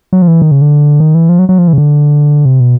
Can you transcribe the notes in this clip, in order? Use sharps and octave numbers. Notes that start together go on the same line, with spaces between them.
F#3
F3
E3
D#3
C#3
D3
D#3
E3
F3
F#3
F#3
F3
E3
C#3
D3
C3
B2